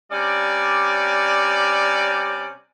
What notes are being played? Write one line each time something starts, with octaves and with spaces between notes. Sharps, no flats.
C3 G3 C#4 D5